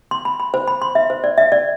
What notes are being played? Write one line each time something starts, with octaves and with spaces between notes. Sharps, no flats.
C6
B5
B5
C5
B5
C6
E5
C5
D5
E5
D5